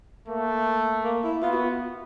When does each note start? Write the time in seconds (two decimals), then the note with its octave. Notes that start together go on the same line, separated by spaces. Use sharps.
0.28 A3 A#3
1.04 A#3
1.24 E4
1.42 B3 F4
1.52 F#4
1.62 F4